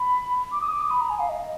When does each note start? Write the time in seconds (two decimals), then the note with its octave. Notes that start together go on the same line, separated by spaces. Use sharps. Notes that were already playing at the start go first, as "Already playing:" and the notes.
Already playing: B5
0.52 D6
0.61 D#6
0.72 D6
0.81 D#6
0.91 B5
1.00 A#5
1.10 G#5
1.20 F5
1.29 D#5